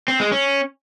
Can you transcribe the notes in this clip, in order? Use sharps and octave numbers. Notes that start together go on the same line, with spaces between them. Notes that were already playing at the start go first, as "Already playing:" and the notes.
C4
G#3
C#4